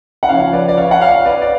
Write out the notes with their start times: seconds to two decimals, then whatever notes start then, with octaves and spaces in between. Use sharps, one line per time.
0.23 F#5
0.29 C#3 F3 C#5 F5
0.53 B4 D5
0.68 D5
0.77 C#5 F5
0.91 F#5
1.01 C#5 F5
1.25 B4 D5
1.42 D5